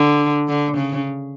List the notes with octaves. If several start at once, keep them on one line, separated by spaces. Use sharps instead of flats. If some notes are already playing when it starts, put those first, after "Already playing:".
Already playing: D3
D3
C#3